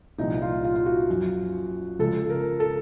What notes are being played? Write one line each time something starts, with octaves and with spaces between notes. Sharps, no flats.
C2 A#2 F3 D#4
F4
F4
F4
F#4
F#2 F3
C#2 C#3 F3 A4
A#4
A4